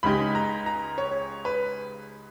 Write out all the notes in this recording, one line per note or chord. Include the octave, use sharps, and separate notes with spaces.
C#2 C#3 G#3 D#4 G4 B5
A#5
A#5
C#5
B4